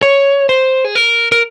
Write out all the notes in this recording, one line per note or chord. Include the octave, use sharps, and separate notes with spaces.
C#5
C5
G#4
A#4
A#4